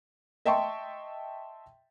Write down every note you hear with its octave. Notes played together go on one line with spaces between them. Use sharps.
D#5 E5 G5 A5 C6 C#6